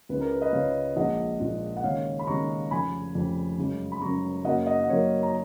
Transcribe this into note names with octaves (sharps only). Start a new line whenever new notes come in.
C#2 C#3 G#3 B4
A#4
B4
B4 D#5
C#2 C#3 G#3 C#5 F5
A#1 A#2 G#3 D#5 F#5
A#1 A#2 G#3
F#5
D#2 C#3 G#3 C#5 F5
B5
D#2 C#3 G#3 A#5 C#6
F1 F2 C#3 G#5 B5
F1 F2 C#3
F#2 C#3 G#3
B5
F#2 C#3 G#3 A#5 C#6
F#2 C#3 F#3 A#3 D#5 F#5
D#5 F#5
F#5
F#2 C#3 F#3 A#3 C#5 F5
A#5